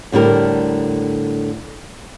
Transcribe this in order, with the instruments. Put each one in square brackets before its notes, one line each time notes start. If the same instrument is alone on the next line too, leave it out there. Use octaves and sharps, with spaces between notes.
[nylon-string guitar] A2 D3 G3 A#4